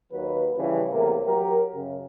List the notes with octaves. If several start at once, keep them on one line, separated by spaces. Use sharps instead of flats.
D#2 F#3 B4
C#3 E3 F3 G3 C#4
E2 A2 C3 A#3 A#4
F#3 G4 A#4
F#2 C#3